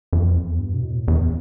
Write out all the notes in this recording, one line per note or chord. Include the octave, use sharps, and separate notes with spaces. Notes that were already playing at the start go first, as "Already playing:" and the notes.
F2
E2
G2
B2
A2
E2